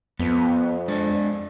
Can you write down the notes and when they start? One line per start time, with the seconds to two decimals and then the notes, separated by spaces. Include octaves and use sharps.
0.19 F2 B3
0.88 G#3 D4 D5